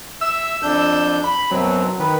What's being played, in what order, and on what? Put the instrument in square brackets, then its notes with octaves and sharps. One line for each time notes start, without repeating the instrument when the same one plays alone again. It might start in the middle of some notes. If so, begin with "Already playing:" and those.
[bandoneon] E5 [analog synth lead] E6
[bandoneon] F2 D4 G6
[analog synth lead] B5
[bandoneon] F#2 B2 C4 [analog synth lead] F#3
[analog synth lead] D#3 [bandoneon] B4